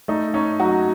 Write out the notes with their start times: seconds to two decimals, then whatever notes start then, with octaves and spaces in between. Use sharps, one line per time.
0.08 A3 D#4
0.34 C#4 D#4
0.60 F#3 D#4 F#4